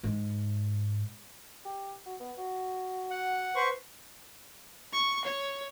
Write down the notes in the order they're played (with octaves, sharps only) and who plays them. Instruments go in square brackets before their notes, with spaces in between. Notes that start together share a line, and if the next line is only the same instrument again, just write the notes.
[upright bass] G#2
[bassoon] G4
F#4
B3
F#4
[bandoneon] F#5
[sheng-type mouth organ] B4 C5 C#6
[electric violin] C#6
C#5